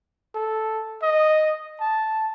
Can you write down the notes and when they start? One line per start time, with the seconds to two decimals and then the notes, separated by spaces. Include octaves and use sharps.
0.35 A4
1.02 D#5
1.80 A5